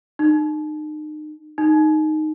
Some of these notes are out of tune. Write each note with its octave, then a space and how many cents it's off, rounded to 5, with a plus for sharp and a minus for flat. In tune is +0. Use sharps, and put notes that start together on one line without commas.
D#4 -35
D#4 -5